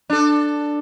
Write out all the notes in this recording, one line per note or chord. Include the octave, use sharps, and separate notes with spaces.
D4 A4